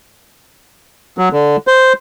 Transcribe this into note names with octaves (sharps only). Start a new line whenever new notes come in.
F#3
D3
C5